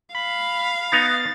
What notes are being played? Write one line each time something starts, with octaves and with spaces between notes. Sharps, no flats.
F5 B5
B3 D#4 A#5 A6